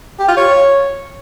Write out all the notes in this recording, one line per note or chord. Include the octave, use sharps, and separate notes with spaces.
G4
F4
C#5